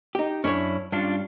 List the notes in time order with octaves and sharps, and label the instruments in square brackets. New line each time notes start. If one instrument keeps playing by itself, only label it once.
[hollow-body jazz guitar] D#4 G4
[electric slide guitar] F#2 E4 [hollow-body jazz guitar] C#4 D4 C#5
[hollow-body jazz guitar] G2 [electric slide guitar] C#4 D4 F4